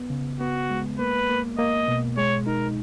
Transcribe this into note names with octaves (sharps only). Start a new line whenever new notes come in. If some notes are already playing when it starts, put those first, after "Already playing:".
Already playing: B3
C#3
B3 F#4
G#3
A#3 B4
A#3
A#3 D#5
B2
G#3 C#5
D#4 A#4